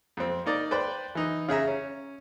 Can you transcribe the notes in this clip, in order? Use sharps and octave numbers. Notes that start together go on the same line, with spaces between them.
F2 C4
A#3 D#4 D5
B4 C5 D5 G5
E3 D#4
C#3 G#4 E5 A#5
C#4